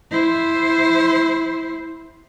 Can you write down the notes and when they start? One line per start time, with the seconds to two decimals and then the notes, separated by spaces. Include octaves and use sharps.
0.11 E4 C5